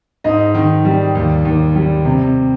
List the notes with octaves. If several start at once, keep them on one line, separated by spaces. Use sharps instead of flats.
G#2 D#5
D#3
G3
D#2
D#2
G3
C3